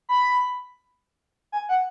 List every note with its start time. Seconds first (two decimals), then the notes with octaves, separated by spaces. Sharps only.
0.09 B5
1.52 G#5
1.69 F#5